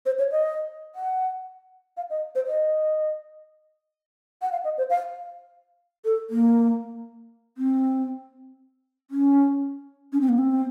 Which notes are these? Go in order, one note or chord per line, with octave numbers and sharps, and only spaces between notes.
C5
C#5
D#5
F#5
F5
D#5
C5
D#5
F#5
F5
D#5
C5
F5
A4
A#3
C4
C#4
C#4
C4
A#3
C4